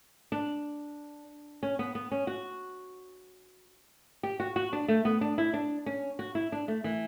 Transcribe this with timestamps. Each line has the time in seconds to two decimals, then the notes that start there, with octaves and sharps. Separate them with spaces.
0.32 D4
1.63 C#4
1.79 B3
1.95 B3
2.12 C#4
2.27 F#4
4.23 G4
4.40 F#4
4.56 F#4
4.73 D4
4.88 A3
5.05 B3
5.21 D4
5.38 E4
5.54 D4
5.86 C#4
6.19 F#4
6.35 E4
6.52 D4
6.68 A3
6.84 E3